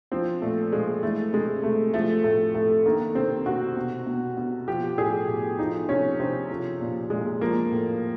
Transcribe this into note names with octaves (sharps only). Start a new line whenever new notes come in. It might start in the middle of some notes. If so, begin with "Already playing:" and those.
F3 C4
A#2 A3
A#2 G#3
E3 A3
C3 G#3
C3 A3
F3 A3
A2 A3
A2 A3
D#3 A#3
C3 C4
C3 F#4
B2
B2
B2
F3 G4
A2 G#4
A2
F3 D#4
C3 C#4
C3 C4
F3
A#2
A#2 G#3
F3 A#3
A2